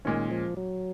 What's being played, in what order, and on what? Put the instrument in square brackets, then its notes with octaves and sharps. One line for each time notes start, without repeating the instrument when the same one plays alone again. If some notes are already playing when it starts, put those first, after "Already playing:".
[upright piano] A#2 G#3 C#4 [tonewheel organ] D#3
[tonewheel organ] F3
F#3